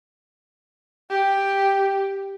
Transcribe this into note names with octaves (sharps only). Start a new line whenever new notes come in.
G4